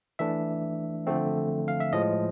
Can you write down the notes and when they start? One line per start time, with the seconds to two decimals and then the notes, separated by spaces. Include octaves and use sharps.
0.19 E3 A3 D4 E5
1.07 D3 F3 A3 C4
1.68 F5
1.80 E5
1.93 A2 F3 G#3 D#5